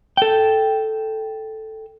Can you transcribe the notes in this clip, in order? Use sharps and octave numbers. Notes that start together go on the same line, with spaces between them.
A4 G5